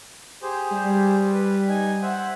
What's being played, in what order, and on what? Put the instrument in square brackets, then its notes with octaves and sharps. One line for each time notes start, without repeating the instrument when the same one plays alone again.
[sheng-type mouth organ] G4 G#4 C5
[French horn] G3
[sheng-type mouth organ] B4
D#4 G#5
C5 E5 F#5